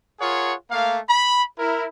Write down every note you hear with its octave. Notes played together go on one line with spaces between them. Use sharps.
F4 G#4 A#4 C#5 F#5
A3 A#3 F5
B5
E4 A#4